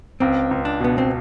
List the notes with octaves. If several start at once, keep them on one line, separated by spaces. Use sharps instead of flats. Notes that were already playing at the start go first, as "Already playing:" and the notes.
C#2 C4
C#2
D4
B2 B3
C4